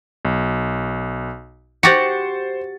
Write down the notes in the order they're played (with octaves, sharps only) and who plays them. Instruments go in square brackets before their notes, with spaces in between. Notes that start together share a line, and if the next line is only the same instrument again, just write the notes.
[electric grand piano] B1
[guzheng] F#4 G4 F#5 [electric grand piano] C5 A6 C#7